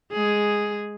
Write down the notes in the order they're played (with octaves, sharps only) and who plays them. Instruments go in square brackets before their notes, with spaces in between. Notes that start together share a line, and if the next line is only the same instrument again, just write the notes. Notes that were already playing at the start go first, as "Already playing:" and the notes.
[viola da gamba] G#3 G#4